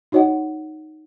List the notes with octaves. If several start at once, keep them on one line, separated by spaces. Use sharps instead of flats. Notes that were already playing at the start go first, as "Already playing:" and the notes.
D#4 F#4 C#5 D#5 F#5